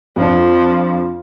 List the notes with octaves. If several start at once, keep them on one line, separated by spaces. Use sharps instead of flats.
F2 F3 D4